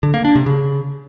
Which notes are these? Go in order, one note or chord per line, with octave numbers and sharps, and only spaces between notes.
D3
A#3
D4
C3
C#3